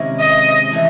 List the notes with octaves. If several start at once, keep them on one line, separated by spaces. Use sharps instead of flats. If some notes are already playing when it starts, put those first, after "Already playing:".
Already playing: C3 D#3 G#3 C#4 E4
D#5
E3 A3 C4 E4